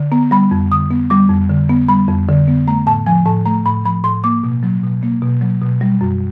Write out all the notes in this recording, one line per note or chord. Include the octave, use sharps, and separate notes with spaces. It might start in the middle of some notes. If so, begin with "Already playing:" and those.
Already playing: D3
B3 A#5
G3 B5
F2
D3 D#6
B3
G3 D6
F2
D3
B3
G3 B5
F2
D3
B3
A3 A#5
A2 A5
F3 G#5
A2 A5
A3 A#5
A2 B5
F3 B5
A2 C6
A#3 D6
B2
F#3
B2
A#3
B2
F#3
B2
G3
F#2